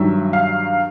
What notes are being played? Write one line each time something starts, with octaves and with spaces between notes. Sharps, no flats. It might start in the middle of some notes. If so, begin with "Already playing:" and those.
Already playing: G2 D#3 F#3 E5
F5